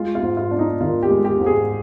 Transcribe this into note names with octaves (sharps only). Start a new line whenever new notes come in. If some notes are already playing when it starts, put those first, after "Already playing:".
Already playing: G#3 F4
F4
G#2
F4
D4
D#4
D#3 F4
G4
G#3
G4
G#2
G#4